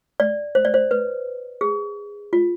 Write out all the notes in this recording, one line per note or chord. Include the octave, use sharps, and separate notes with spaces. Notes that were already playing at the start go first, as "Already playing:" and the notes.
D5
C5
D5
C5
B4
G#4
F4